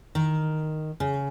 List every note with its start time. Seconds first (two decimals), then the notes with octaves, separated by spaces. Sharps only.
0.15 D#3
1.00 C#3